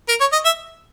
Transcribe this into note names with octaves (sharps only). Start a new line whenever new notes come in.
A#4
C#5
D#5
E5